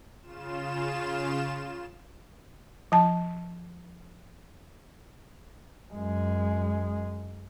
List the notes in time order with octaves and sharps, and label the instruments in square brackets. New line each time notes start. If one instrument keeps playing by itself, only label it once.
[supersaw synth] C#3 F4 E7
[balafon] F3 A5
[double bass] F#2 G#3